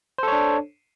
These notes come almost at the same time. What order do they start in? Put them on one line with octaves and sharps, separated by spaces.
C5 A4 C#5 D4